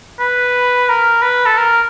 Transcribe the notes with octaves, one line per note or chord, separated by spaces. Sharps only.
B4
A#4
B4
A4
A#4